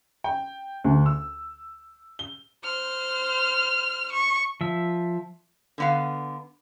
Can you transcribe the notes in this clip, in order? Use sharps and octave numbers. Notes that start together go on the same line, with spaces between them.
G5
D2
E6
G7
C5 F6
C#6
F3 E5
D3 B3 F5